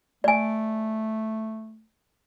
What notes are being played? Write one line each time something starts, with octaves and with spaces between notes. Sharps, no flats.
A3 D5 G#5